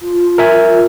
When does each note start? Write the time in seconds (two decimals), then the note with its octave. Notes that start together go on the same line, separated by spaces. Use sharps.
0.01 F4
0.38 A#4 E5 G#5
0.67 F4